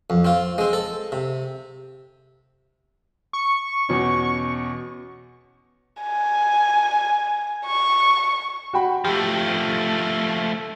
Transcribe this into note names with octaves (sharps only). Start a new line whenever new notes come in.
F2
C4 F4
G#3 C4
A4
C3
C#6
E2 B2 C#4
G#5
C#6
F#4 G5 B5
F3 A3 G4